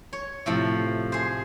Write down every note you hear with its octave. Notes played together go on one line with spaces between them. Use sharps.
C#5
A2 C3 F3
G#4 C5